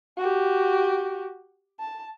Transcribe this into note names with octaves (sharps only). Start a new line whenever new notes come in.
F#4 G4
A5